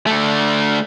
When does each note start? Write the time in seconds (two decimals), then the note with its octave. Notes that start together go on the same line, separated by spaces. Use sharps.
0.07 D3 A3